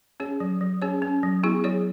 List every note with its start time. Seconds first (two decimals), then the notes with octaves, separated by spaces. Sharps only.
0.20 C#4 G#4 C#5
0.40 F#3
0.61 F#3
0.82 C#4 G#4 C#5
1.02 C#4
1.23 F#3
1.43 B3 E4 G#4
1.64 F#3 G#4 C#5